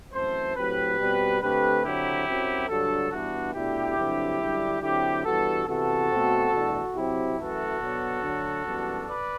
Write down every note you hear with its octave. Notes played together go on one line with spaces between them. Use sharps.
F#2 E3 A3 C4 A4 C5
A2 F#3 C4 G4 B4
B2 G3 C4
D3 A3 C4 G4 B4
D3 F#3 C4 E4 G4
F#2 F#3 C4
G2 D3 F#3 F#4 A4
G2 E3 B3 D4 F#4
B2 A3 D4 E4 G4
G2 D3 F#3 C4
F#2 D3 G3 D4
D3 F#3 C4 E4 G4
G2 E3 G3 B3 F#4 A4
C3 E3 B3 F#4 A4
B2 A3 C4
E2 B2 A3 D4
C3 F#3 C4 E4 G4
F#2 E3 A3 F#4 A4
B2 F#3 B3 D4
D3 F#3 A3
F#2 E3 G3 B3 D4
B4 D5